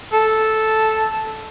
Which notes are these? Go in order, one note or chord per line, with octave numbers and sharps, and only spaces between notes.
A4